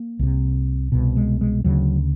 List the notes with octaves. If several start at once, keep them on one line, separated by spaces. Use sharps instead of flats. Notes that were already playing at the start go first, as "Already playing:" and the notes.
Already playing: A#3
C2 C3
C2 B2
G#3
G#3
D2 C#3 F#3